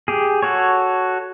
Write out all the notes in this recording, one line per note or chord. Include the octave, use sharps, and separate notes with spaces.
G4 G#4
F#4 A4 C#5